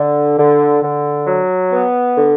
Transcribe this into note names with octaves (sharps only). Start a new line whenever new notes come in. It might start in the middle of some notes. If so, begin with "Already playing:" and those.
Already playing: D3
D3
D3
F#3
B3
D3